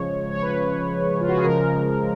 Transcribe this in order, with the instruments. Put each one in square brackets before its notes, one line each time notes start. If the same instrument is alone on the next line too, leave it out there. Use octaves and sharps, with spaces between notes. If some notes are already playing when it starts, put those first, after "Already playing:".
Already playing: [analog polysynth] C#3 F3 G#3 C#5
C#5
B4
F4
F#4
G#4
C#3 F3 G#3 A#4